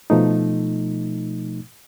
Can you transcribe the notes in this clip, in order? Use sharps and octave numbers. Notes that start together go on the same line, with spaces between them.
B2 F3 A3 D#4